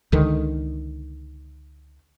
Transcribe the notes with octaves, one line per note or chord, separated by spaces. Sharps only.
C#2 D3 D#3